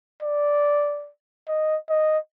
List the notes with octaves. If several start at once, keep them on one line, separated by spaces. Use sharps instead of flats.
D5
D#5
D#5